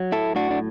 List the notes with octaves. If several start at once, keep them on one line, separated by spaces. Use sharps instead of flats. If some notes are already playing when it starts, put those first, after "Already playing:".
Already playing: F#3
E4 A4
A2 D4 F#4
D4